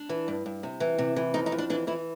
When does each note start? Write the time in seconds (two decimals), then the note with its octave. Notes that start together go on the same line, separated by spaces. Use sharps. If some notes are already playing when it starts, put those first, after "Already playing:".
Already playing: D4
0.09 E3
0.28 G2
0.46 G2
0.63 C3
0.80 E3
0.98 C3
1.16 E3
1.34 F2 D#4
1.46 D#4
1.52 F2
1.58 D4
1.70 E3 D4
1.87 E3 E4